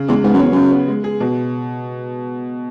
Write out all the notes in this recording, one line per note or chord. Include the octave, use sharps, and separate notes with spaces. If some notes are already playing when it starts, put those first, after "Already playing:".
Already playing: C#3
E2 G#3
G#2 B3
F#2
E2 C#5
F#2 C#3
B3
G#3
G#4
B2